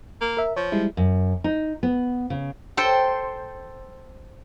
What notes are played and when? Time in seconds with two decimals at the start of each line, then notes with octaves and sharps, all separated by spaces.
0.21 A#3
0.37 A#4 E5
0.56 F3 C#5
0.72 G3 G#3 E4
0.97 F#2
1.44 D#4
1.83 B3
2.30 C#3
2.77 A4 C5 G5